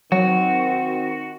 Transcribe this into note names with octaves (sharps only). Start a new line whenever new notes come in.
D#3 F#3 C4 F#4